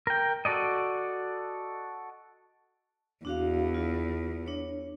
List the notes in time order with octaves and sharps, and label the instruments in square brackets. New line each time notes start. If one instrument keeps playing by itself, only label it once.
[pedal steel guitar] A#4 G5
F#4 A4 D5 D#5
[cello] E2 [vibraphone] D4 F#4 F5
[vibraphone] F4
D4 C#5